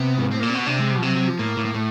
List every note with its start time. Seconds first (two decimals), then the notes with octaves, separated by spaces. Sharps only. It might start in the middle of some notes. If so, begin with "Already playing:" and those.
Already playing: C3 B3
0.18 G#2
0.31 A2 C4
0.40 A#2 A#3
0.50 C4
0.54 B2 B3
0.67 C3 D4
0.80 G#3
0.91 G3
0.95 B2
0.98 F3
1.03 C3 F#3
1.15 F#3
1.27 F3
1.39 A2 A#3
1.57 A2
1.65 A#3
1.74 A2 A3